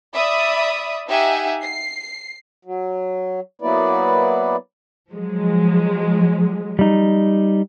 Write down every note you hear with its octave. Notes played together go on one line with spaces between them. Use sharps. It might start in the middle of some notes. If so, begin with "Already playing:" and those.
D5 E5 B5 D#6
D#4 G4 E5 F#5 G#5
C7
F#3
F#3 A#3 B3 E4 B4 D5
F3 F#3 G#3
G3 D#4